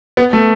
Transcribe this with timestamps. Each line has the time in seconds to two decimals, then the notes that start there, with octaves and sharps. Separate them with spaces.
0.17 B3
0.33 A3